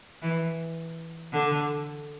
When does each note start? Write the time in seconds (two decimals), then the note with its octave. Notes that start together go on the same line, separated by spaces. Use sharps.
0.22 E3
1.33 D3